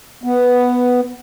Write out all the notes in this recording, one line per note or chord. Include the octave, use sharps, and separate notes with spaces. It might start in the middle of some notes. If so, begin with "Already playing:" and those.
B3